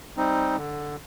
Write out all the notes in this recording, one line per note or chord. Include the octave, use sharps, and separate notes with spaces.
G3 C4 D#4
D3